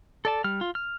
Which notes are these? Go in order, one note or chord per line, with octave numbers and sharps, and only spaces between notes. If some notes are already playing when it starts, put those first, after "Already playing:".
A4 D5 A5
G3 F6
F4
F6